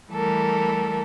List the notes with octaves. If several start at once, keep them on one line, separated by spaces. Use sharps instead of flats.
E3 G3 A3 A4 A#4